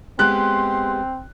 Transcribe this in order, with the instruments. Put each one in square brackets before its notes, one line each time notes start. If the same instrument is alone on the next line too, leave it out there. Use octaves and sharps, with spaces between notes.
[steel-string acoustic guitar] G#3 B3 G4 [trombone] C4 [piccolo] C6 [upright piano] F#6